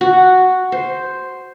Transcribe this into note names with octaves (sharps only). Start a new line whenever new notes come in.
F#4
C5